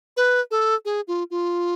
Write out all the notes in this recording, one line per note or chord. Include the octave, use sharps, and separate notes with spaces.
B4
A4
G#4
F4
F4